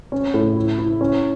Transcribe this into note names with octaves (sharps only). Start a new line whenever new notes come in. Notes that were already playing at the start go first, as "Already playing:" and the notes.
C#4
A2
E4
E4
C#4